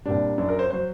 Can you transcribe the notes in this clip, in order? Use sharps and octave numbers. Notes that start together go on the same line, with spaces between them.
C2 A#2 G3 D4
F#2 F#3 D4
A#4
C5
F#3 C5